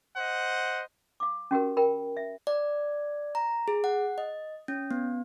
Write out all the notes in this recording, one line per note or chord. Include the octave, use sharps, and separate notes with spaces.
C5 D#5 F#5
F5 D6
C#4 F#4 G4 A#4
A#4 G5 B5
E5
D5
A#5
G#4
F#5
D#5
C#4
B3